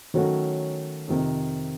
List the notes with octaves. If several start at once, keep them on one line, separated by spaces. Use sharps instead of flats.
D#3 F#3 A3 C#4 F#4
F2 C3 D#3